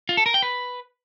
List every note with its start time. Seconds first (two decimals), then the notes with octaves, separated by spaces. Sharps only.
0.09 F4
0.17 A4
0.26 A#4
0.34 G5
0.43 B4